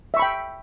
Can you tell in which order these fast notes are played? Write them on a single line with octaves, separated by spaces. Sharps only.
E5 C#6 B5 G5